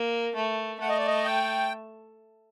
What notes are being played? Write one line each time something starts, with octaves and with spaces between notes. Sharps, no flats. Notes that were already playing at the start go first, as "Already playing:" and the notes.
Already playing: A#3
A3
A3 F#5
D#5
D5
D#5
G5